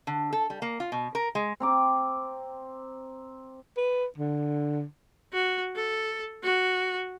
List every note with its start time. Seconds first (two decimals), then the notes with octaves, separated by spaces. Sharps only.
0.07 D3
0.33 A4
0.50 G3
0.62 A#3
0.80 F4
0.92 B2
1.15 A#4
1.35 G#3
1.60 C4 A#5 D6
3.77 B4
4.18 D3
5.33 F#4
5.76 A4
6.43 F#4